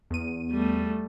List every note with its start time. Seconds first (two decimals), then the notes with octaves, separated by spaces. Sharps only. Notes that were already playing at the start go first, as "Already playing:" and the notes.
0.10 E2 D#7
0.51 G3 A3